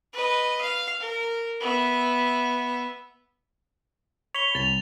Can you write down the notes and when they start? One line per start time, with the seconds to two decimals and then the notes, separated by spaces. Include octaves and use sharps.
0.13 B4 D#5
0.61 F5
1.00 A#4
1.60 B3 E5
4.35 C#5 B5 F7 G7
4.55 C2 A6 F7 G7